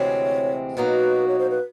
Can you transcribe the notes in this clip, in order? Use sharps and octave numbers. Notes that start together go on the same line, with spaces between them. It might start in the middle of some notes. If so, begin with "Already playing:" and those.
Already playing: D2 C3 E3 G#3 C4 C#5
B2 F#3 A#3 D#4 F#4 B4
C#5
C5
B4